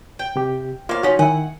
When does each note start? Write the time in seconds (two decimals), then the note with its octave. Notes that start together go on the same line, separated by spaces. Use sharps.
0.19 G5
0.36 C3 G4
0.89 A#3 F4 C5 C#5 F5
1.03 F3 C#4 D#4 F#4
1.19 D#3 E4 F#5 G#5